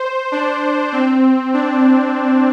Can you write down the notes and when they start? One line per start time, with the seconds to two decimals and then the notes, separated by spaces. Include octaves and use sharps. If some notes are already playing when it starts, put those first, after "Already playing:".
Already playing: C5
0.32 D4
0.92 C4
1.54 D4